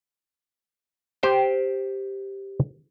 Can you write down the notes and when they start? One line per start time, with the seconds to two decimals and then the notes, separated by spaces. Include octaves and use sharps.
1.23 G4 C5 G5